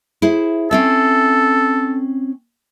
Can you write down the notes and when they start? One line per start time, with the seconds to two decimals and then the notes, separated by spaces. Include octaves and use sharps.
0.22 E4 G#4 C5
0.71 C4 C#4 A4 E5